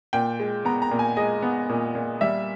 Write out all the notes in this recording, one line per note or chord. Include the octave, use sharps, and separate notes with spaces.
A#2 G5
G#3
B3 A#5
A#5
A#2
G#5
G#3 D#5
B3
A#2
A#2
G3 E5